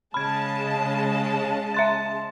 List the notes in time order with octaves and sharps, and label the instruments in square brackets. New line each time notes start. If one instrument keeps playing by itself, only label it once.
[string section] C#3 G#3 A5 [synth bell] B5 G#6
[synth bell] E5 C6 A6